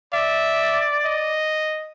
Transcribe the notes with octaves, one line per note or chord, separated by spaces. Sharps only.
D5 E5
D#5